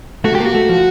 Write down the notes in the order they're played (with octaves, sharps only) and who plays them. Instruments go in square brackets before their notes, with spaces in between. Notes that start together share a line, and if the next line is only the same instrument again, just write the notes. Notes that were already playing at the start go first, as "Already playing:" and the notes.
[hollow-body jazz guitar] A3 [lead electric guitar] F#4
[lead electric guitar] G4
[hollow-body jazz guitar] A#3 [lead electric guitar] F#4
[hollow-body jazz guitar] A3
F3